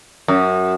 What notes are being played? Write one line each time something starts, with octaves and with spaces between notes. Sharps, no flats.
F#2